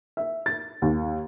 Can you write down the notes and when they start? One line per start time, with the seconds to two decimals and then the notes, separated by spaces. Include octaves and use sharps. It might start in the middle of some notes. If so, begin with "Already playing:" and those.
0.17 E5
0.46 A6
0.82 D#2